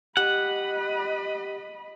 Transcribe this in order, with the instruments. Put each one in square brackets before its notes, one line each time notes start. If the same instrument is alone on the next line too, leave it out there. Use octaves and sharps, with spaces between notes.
[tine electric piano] G4 [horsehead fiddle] D#5 B5 [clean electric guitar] F#5